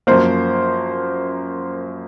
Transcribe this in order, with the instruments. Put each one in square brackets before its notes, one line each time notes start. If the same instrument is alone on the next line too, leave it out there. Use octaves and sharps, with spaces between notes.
[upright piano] F#2 F3 A#3 C5